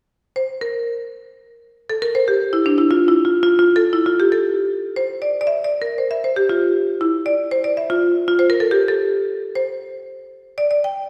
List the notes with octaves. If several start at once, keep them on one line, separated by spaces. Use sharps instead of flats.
C5
A#4
A4
A#4
C5
G4
E4
D4
E4
F4
E4
F4
F4
F4
A4
E4
F4
G4
A4
C5
D5
D5
E5
D5
A#4
C5
E5
C5
G4
F4
E4
D5
C5
D5
E5
F4
F4
C5
A#4
A4
G4
A4
C5
D5
D5
G5